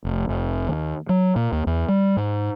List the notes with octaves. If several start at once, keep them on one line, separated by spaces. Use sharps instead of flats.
F1
F1
D#2
F#3
A#2
D#2
E2
G3
G#2